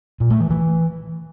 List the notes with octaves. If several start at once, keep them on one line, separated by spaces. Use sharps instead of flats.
A#2
A3
E3
E3